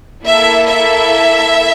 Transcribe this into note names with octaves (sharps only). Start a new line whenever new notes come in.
A#3 E4 A4 E5
E5